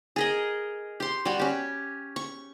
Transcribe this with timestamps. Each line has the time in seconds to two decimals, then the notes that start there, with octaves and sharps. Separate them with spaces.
0.16 G#4 A#4 D#5
1.00 G4 C6
1.25 G3 F#4
1.39 C#4 G4
2.16 C#6